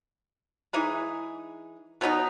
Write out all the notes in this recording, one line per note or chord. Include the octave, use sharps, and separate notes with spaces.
E3 G#3 D#4 G#4
B2 F#3 B3 D#4